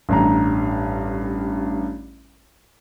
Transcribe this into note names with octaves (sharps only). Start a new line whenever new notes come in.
A1 G2 A#5